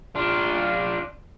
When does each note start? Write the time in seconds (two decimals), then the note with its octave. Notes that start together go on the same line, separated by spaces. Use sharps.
0.15 D4 F4